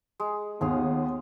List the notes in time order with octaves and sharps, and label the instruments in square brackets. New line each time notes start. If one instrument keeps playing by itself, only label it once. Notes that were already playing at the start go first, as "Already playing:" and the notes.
[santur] G#3
[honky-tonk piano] D#2 [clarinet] B3 [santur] F4 G#4 F5